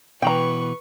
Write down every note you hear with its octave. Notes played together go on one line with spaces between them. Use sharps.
B2 E3 B4 G5 A#5 C#6